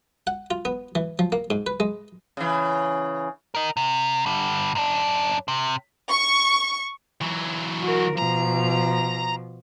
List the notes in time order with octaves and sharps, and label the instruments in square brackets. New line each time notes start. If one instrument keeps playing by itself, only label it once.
[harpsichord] F#5
F4
B3
E3
F3
A#3
G#2
B4
G#3
[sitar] C#3 E3
[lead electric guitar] A#4 D#5
C3
D3 G3
F#2 D4
C3
[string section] C#6
[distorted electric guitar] E3 F#3
[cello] F#4 A#4
[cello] B2 F3 [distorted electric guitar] A#5